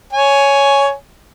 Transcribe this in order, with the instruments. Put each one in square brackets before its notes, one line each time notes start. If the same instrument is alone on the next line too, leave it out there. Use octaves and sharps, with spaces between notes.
[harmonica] C#5 G#5